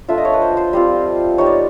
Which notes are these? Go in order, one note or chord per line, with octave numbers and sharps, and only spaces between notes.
A3 D4 F4 E5
D#5
C#5
B4
C5
C5
G3 C4 F4
G3 B3 D#4 C#5
D5